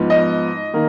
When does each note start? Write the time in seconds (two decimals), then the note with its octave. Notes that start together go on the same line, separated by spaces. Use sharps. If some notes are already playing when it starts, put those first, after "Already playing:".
Already playing: G#2 F3 B3
0.10 D#5
0.74 D#3 A#3